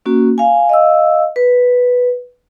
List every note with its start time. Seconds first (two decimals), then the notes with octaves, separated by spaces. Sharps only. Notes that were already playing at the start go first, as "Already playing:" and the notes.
0.05 A#3 C#4 F#4
0.38 F5 G#5
0.69 D#5 F5 E6
1.36 B4